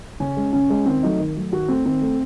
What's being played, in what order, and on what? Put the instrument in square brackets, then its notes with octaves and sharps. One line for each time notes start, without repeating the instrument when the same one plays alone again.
[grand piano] C#3 C#4
G#3
C#3 C#4
G#3
D#3 C4
F#3 A3 D#4
D#3
F#3 A3
D#3 F#4
A3 C4
D#3 C4
A3